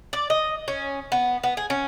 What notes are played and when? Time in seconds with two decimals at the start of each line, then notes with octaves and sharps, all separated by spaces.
0.13 D5
0.30 D#5
0.68 C#4
1.12 B3
1.44 B3
1.57 G#4
1.70 C#4